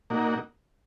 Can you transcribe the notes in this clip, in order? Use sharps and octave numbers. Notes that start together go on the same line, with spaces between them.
A#2 A#3 D#4 F#4